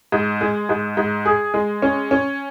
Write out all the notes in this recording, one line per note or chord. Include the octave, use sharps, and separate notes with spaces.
G#2
G#3
G#2
G#2
G#4
G#3
C#4
C#4